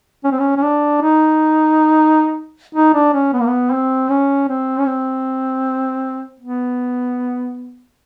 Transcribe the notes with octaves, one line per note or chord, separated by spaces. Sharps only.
C#4
C4
C#4
C#4
D4
D#4
D#4
D4
C#4
B3
A#3
B3
C4
C#4
C4
C#4
C4
B3